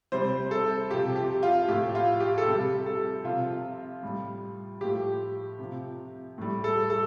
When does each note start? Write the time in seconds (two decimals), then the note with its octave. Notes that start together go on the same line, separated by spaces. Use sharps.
0.12 C3 G3 C5
0.51 A4
0.90 C3 F3 G4
1.16 G4
1.43 F4
1.68 A2 F3 G4
1.95 F4
2.20 G4
2.38 A4
2.46 C3 G3 G4
2.86 A4
3.24 C3 F3 F4
4.02 A2 G3
4.81 A2 F3 G4
5.59 C3 F3
6.38 A2 G3
6.64 A4
6.90 A4